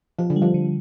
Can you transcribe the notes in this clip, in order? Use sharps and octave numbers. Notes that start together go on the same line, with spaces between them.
F3 F4
D3
G3
F3
D3